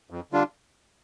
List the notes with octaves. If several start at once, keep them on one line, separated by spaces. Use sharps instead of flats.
F2
D3 G3 D4 F4